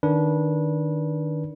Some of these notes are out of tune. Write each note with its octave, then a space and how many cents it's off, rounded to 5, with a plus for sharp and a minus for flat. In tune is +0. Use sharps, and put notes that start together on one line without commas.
D#3 -15 D4 -15 B4 -25